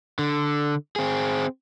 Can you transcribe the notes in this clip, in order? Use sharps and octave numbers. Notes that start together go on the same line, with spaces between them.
D3
C4 G#4